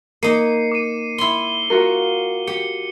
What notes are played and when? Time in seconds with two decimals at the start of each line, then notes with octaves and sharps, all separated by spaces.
0.23 A#3 D#4 C7 C#7 D#7
0.72 D6 D#7
1.18 E4 C6 G7
1.70 F4 F#4 A#4
2.47 G4 C#7